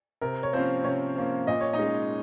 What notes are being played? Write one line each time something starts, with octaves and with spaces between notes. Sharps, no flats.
C3 A#4
C#5
F3 A#3 C4 C#4 C5
C3 C#4 C#5
F3 A#3 C#4
A#2 D#5
C#5
D#4 D#5
G#3 C#4